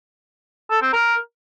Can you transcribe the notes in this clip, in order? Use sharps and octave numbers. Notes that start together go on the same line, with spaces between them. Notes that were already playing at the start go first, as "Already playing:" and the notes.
A4
C4
A#4